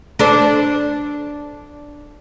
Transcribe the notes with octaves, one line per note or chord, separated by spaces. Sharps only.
D4 A4 C5